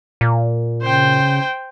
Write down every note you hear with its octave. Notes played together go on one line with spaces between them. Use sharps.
A#2
C#3 C5 G5